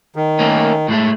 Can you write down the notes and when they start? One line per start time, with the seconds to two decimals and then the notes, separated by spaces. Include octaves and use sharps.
0.16 D#3
0.39 A3 A#3 C#4
0.88 A2 G#3 A3